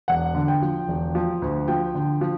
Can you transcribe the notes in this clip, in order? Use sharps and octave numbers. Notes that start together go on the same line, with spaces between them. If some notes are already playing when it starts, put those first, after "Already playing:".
E1 F#5
D3
G5
F3
E1
F3
D2
F3 G5
D3
F3